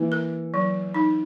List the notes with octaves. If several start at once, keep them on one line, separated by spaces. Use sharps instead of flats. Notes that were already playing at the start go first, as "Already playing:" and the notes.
Already playing: E3 A#3
A#4
F#3
D#4